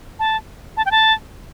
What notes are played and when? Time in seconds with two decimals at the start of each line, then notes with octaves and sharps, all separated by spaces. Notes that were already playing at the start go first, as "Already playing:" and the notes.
0.19 A5
0.77 A5
0.86 G5
0.91 A5